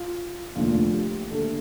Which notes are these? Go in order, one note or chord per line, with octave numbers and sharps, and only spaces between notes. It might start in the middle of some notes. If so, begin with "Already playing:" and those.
Already playing: F4
F1 D#2 D3 F3 F4
G4
D#2 D3 A3 A4